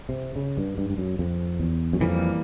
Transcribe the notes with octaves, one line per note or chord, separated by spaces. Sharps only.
C3
C#3
G2
G2
G2
F#2
F2
E2
F#2
F2 E3 G3 A#3